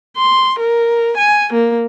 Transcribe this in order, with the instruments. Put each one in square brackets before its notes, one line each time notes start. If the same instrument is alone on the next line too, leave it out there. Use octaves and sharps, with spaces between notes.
[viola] C6
A#4
G#5
A#3